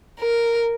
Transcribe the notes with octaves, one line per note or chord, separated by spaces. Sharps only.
A#4